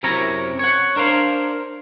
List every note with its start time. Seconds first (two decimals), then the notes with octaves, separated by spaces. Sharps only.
0.03 F#2 C3 E4 A#4 C#5 A#5
0.59 C#5 F#5
0.96 D4 A#4 C5 F5